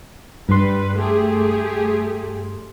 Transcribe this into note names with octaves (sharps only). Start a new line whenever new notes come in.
G2 G3 B4 C6
A3 G4 G#4